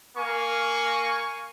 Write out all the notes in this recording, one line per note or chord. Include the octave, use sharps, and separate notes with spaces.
A#3 F5 G#5 C#6